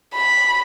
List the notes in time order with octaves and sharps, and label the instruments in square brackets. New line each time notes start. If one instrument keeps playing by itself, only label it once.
[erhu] B5